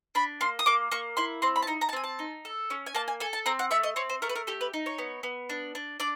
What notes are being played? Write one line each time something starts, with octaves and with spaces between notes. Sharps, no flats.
D4 B5
A#3 C6
D#6
A#3 D6
A#3 C#6
E4 C6
C4 C6
B5
A5
D#4 A#5
A#5
A5
C4 G#5
A5
D#4
A4
C#4
G#5
A#3 A5
G#5
A4 G#5
A5
C4 A#5
F#5
A3 E5
D#5
C4 C#5
C5
A3 A#4
B4
A#4
G4 A4
B4
D#4
C#5
B3
B3
D4
D4
D4 D5